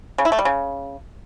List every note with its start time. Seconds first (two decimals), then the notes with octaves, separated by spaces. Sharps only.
0.18 C#3
0.25 E4
0.32 A3
0.39 G3
0.45 C#3